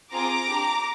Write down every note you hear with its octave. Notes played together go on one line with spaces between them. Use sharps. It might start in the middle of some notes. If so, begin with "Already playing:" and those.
C4 F4 G#4 A#5 D6
D4 G4